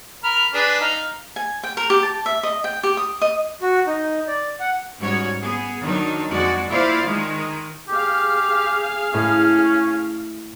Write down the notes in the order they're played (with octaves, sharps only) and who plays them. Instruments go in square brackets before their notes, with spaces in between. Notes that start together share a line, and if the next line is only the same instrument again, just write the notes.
[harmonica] A#4 B5 F6
D4 G#4 B4
D#4 F5
[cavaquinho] G#5
G5
A#4
G4
A5
E5
D#5
G5
G4
D#6
D#5
[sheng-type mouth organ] F#4
D#4
D5
F#5
[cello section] G#2 G3 C#4 F#4 C#5
B3 G#4
D#3 F#3 D4 D#4
F2 G#3 F#4 D5
A#3 E4 F4 C5 D5 F5
D#3 G#3
[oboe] G4 [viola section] G#4 F5
[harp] A2 [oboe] C#4